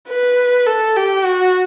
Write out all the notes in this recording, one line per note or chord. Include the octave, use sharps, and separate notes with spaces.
B4
A4
G4
F#4